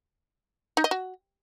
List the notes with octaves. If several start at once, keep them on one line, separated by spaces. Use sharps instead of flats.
D#4
D#5
F#4